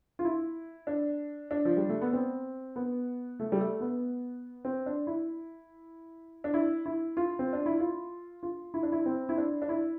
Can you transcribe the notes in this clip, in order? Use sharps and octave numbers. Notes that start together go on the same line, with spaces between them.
F4
E4
D4
D4
F3
G3
A3
B3
C4
B3
A3
G3
A3
B3
C4
D4
E4
D4
E4
E4
F4
C4
D4
E4
F4
F4
E4
D4
E4
C4
E4
D4
D4
E4